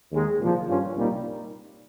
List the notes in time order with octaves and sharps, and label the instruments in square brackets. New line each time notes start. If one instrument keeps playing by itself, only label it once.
[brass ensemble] D#2 D#3 G#3
C2 A#2 F3
G2 G3 C#4 F4
C2 A#2 G3 A#3 D#4